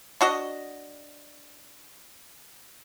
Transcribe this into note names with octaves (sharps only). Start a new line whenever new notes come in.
D4 F#4 D#5